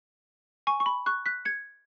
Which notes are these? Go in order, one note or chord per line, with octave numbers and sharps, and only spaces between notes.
G#5 C#6
C#6
B5
C#6 F#6
F#6 B6
G#6 C#7